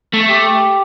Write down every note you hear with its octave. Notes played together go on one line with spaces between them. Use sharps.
A3
G4